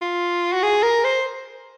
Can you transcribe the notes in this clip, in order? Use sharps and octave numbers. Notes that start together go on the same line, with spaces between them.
F4
F#4
G#4
A#4
C5